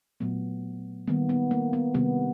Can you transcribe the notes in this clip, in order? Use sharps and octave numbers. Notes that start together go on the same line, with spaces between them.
A#2 F#3 A3 B3
D#3 G3 A#3 B3
B3
A#3
B3
C3 D#3 G3 A#3 B3